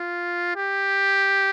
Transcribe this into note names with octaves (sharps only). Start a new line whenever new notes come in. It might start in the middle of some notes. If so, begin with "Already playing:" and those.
Already playing: F4
G4